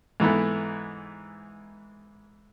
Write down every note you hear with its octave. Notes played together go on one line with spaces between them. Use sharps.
G#2 E3 A3 B3